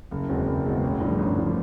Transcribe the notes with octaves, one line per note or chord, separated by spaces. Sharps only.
F#1
E2 B2 G#3 C4
F#1
E2 B2 G#3 C4
A1
G2 D3 F3
A1
G2 D3 F3